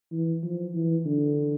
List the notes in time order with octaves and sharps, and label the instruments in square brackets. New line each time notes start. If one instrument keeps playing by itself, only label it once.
[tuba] E3
F3
E3
D3